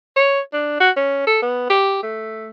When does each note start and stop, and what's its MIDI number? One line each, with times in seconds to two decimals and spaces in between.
0.16 0.40 73
0.53 0.80 62
0.80 0.90 66
0.96 1.26 61
1.27 1.41 69
1.42 1.69 59
1.70 1.98 67
2.03 2.50 57